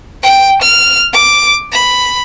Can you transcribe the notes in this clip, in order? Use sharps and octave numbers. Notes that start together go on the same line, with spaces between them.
G5
F6
D6
B5